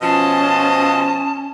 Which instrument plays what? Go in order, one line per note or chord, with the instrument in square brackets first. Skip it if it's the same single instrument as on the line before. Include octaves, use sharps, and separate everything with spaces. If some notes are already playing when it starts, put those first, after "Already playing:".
[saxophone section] B2 F3 [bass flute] C#4 [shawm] D#5 [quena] A5